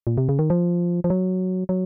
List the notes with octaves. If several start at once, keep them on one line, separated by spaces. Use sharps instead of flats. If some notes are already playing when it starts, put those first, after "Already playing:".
A#2
C3
C#3
D#3
F3
F3
F#3
F#3